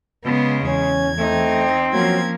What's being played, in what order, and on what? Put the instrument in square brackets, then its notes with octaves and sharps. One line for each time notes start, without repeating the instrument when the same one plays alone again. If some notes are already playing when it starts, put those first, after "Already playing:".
[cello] C#3 G#3 [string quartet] B3
[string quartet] E2 G#6 [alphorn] C#4
[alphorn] A3 [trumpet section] C4 [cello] D#4
[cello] F3 C#4 [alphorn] F#3 [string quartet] A#3 G#6